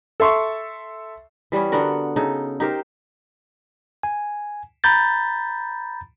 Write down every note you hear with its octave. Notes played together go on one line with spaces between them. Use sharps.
A4 E5 C6 C#6
E3 G3 B3 C#4
D3 B3 F#4 A#4
C#3 D#4 A4
D#4 G4 A#4 C5
G#5
A#5 B5 G6 A6